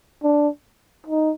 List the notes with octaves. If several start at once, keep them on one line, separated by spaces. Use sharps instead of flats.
D4
D#4